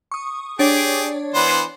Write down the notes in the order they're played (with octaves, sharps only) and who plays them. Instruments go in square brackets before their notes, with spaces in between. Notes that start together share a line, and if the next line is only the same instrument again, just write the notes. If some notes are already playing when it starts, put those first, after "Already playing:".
[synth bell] C#6 D#6
[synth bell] D4 C#5 D5 [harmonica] G4 G#4
[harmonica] E3 B3 C5